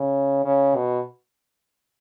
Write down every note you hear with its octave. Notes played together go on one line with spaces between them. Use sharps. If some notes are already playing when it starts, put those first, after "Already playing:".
Already playing: C#3
C#3
B2